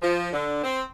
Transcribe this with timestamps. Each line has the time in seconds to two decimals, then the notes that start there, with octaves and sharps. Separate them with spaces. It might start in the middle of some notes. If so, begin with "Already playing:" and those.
0.02 F3
0.32 D3
0.64 C4